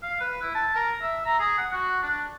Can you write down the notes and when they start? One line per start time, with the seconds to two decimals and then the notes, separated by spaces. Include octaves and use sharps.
0.03 F5
0.20 B4
0.42 E4
0.55 A5
0.75 A#4
1.02 E5
1.26 A#5
1.39 G#4
1.58 F#5
1.73 F#4
2.02 D4